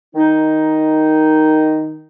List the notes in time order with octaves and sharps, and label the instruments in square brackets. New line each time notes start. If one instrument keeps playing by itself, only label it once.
[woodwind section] D#3 D#4